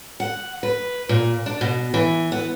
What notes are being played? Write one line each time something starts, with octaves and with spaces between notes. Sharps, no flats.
F#5
B4
A#2
D4
B2
E3
B3